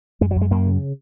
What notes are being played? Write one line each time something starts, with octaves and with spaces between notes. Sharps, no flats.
F#2 G#3
F#3
F#2
G#3
F#2 A#3
C#3